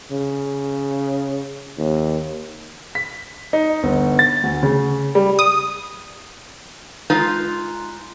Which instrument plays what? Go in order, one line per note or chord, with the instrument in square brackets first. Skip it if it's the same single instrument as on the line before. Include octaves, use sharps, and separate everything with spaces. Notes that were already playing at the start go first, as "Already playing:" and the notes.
[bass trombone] C#3
D#2
[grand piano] B6
D#4
G1
A6
D2
C#3
G3
[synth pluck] D#6
[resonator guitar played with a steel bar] G#3 D#4 F4 B4